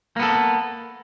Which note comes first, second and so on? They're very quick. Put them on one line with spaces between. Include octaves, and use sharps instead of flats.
A#3 B3 A4